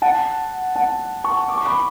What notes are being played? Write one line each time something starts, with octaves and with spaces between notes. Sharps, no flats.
F#5 A5
F#5 A5
A5 C#6
D6
C#6
B5 D6